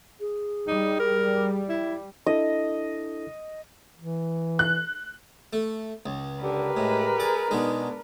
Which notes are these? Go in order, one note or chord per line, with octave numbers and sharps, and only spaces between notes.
G#4
G3 D#4
A#4
E4
D4 E4 A4 D#5
E3
F#6
A3
C#2
D3 G4 A#4 B4
A2 G#3
G#4 D5
B2 G#3 D4 D#4